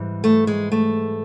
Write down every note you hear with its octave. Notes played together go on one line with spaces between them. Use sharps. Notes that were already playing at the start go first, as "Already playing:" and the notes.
Already playing: G#2 E3 G3
A3
G#3
A3